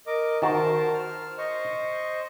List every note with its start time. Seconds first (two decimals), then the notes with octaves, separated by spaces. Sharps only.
0.07 A#4 D#5 D6
0.42 D#3 F#4 A#4 C5 A5
0.94 F6
1.38 C5 D#5 C#6